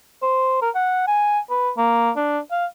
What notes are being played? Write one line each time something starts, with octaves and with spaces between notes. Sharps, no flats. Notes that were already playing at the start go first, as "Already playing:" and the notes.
C5
A#4
F#5
G#5
B4
A#3
D4
F5